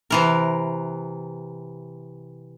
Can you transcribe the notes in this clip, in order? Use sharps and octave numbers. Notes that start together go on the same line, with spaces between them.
C3 E3 A#4